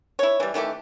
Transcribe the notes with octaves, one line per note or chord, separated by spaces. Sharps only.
E4 C#5
E3 G3
D#3 E3 A3 G4